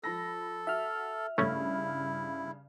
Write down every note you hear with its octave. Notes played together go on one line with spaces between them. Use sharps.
F3 A4 B5 A#6
F#4 E5 F6
G2 C#3 A3 C#4 E4